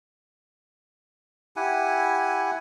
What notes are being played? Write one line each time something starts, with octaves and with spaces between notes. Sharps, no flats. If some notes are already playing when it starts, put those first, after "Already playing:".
E4 G4 F#5 G#5